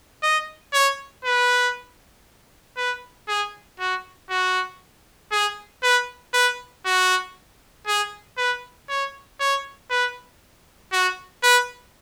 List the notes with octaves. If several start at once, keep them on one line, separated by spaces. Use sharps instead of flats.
D#5
C#5
B4
B4
G#4
F#4
F#4
G#4
B4
B4
F#4
G#4
B4
C#5
C#5
B4
F#4
B4